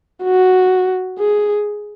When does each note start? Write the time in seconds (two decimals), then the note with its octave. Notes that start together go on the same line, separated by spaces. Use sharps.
0.24 F#4
1.19 G#4